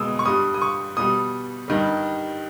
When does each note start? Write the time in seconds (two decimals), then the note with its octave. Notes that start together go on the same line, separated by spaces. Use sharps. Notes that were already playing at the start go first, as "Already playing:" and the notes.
Already playing: B2 G#3 D#6 E6
0.19 C#6
0.26 G2 G3 D#6
0.54 D#6
0.62 C#6
0.97 B2 G3 D#6
1.68 G2 D#3 G3